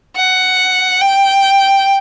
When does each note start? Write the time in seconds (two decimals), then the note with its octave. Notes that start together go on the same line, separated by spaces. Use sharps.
0.16 F#5
1.01 G5